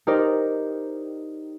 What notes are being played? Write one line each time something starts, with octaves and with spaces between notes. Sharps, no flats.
D#4 G4 A#4 C5 D5